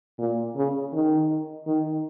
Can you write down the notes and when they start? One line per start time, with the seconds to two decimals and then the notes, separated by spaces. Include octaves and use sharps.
0.19 A#2
0.56 C#3
0.93 D#3
1.67 D#3